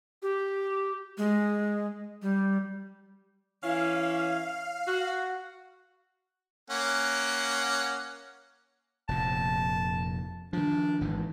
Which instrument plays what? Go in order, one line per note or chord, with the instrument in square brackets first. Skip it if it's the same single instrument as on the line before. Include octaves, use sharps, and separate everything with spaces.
[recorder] G4
G#3
G3
[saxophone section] E3 C#4 E4 [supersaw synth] F5
[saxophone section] F#4
[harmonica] A#3 C#4 F#5
[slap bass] F1 A#2 [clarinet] A5
[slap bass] D#3 F3 [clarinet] D4
[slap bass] G#1 G#2 E3